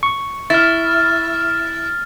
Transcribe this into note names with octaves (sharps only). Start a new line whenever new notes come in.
C#6
E4 F6 A6